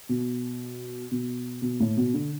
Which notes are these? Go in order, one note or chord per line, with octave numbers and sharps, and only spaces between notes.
B2
B2
B2
A2
B2
D3